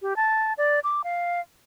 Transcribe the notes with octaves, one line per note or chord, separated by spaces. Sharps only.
G4
A5
D5
D6
F5